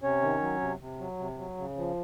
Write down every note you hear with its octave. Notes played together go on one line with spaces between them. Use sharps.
C3 C#4 C#5
D#3
F#3
C3
C3
F#3
C3
F#3
C#3
F3